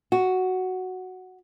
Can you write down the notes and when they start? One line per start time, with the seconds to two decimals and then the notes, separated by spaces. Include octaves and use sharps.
0.12 F#4